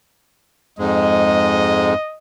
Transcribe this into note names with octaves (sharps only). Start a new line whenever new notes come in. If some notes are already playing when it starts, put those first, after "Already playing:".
F2 G#2 G#3 D#5